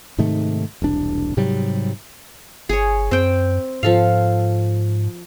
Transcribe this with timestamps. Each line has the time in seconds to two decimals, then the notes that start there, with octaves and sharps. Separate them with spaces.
0.18 G#2 C3 D#3 A3
0.82 E1 C2 D4
1.37 G#2 C3 F#3 G3
2.69 G1 G#4 C#5
3.11 F#2 C4 G5
3.83 G#2 F3 A4 F5